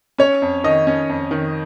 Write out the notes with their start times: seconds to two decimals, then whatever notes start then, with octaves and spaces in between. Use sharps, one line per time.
0.18 C#4 C#5
0.42 F2
0.64 D#3 D#5
0.87 C#4
1.09 F2
1.31 D#3